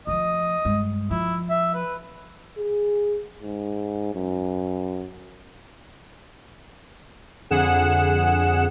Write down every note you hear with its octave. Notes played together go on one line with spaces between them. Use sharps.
F3 A3 D#5
G2 G#3
F3 E4
E5
B4
G#4
G#2
F#2
F2 D3 G#4 F#5 E7